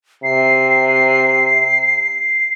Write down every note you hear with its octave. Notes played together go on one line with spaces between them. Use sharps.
C3 C7